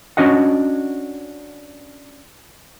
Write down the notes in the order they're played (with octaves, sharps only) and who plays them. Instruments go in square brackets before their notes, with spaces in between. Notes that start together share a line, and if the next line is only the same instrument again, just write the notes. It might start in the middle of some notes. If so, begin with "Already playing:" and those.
[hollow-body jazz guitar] C#4 D4 F#4 D#5 F#5